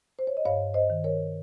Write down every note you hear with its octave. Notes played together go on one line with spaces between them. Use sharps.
C5
C#5
D#5
G2 C#5 F5
C5 D#5
D#3
A#4 C#5